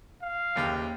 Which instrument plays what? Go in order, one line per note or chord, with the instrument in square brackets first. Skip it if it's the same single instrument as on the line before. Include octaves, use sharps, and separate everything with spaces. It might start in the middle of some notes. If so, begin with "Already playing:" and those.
[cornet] F5
[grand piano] F#1 D#2 G4